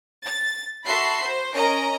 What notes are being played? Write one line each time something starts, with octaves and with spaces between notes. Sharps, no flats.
A6
F#4 A4 E5 B5 C6 C7
C5
C#4 A#4 D#5 A#5